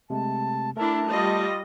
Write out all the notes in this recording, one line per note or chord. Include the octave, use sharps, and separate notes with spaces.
C3 G#3 A3 A5
A3 D4 E4 A#4 A5
G3 F4 D#5